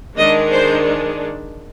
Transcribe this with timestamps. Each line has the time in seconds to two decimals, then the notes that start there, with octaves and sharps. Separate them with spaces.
0.17 D#3 G#3 D4 D#5
0.51 C5